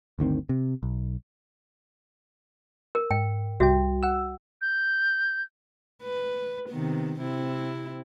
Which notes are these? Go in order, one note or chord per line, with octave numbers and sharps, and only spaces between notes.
G1 D2 D#3 C4
C3
B1
A#4
G#2 G5
C2 G3 F#4 E5 G5
F#5 E6
G6
B4
C3 D#3 B3
C3 C4 E4